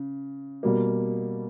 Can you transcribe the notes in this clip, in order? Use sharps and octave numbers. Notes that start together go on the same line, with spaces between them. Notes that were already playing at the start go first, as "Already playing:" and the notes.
Already playing: C#3
B2 G3 A#3